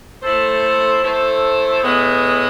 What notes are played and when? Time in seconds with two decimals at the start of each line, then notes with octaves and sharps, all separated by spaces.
0.22 A3 E4 A4 C5
1.02 A3 E4 A4 C5
1.82 A2 G#3 B3